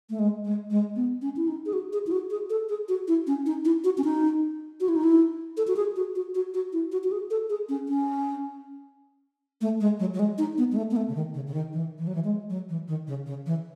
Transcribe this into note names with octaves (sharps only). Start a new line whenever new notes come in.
A3
G#3
G#3
G#3
B3
C#4
E4
D#4
G#4
F#4
G#4
E4
F#4
G#4
A4
G#4
F#4
E4
C#4
D#4
E4
F#4
C#4
D#4
F#4
E4
D#4
E4
A4
F#4
G#4
F#4
F#4
F#4
F#4
E4
F#4
F#4
G#4
A4
G#4
C#4
C#4
A3
G#3
F#3
F#3
G#3
D#4
B3
G#3
A3
B3
A3
C#3
D#3
C#3
C#3
D#3
E3
E3
F#3
E3
G#3
F#3
E3
D#3
C#3
C#3
E3